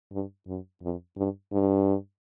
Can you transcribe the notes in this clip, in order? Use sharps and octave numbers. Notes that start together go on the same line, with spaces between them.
G2
F#2
F2
G2
G2